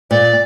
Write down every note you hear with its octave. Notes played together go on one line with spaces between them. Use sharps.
A#2 D5